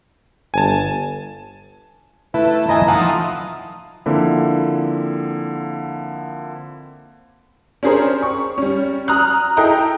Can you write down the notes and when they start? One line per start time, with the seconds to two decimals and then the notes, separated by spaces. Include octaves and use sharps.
0.54 G1 G#5 A5
2.34 A3 E4 B4
2.69 E4 D#5 G#5 A#5
2.88 E3 F3 D#4 F#5 A5
4.06 D3 F3 A#3 C4 E4
7.83 C#4 D4 G4 G#4 A#4 C5
8.23 C#6
8.58 G3 C#4
9.08 A#5 D#6 F6 F#6
9.57 E4 G#4 A4 D#5 G5 A#5